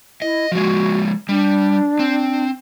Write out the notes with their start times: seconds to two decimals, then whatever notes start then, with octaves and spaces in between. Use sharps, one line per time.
0.22 E4 D#5
0.52 F3 G#3 F#4
1.29 G3 D4
1.99 C4